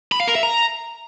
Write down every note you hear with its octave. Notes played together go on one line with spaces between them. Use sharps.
B5
F5
A#4
E5
A#5